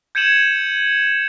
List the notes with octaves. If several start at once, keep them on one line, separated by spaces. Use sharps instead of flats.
G6 G#6 C#7 D#7 E7 F#7